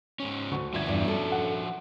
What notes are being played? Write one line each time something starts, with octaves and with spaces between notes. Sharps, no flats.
G#2 B2 C#4
D2 F#5 C#6
G1 F3 F#4 D5 E5 G#6
E2 G2
C#4 A4
F#5